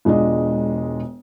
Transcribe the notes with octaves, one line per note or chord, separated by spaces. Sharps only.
E1 G#3 D4 F4 D#5